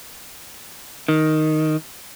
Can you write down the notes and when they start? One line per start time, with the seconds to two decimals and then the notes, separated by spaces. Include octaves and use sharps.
1.08 D#3